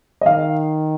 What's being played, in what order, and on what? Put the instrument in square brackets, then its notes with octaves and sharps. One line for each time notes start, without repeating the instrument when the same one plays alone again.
[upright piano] D#5
[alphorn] D#3 [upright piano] F5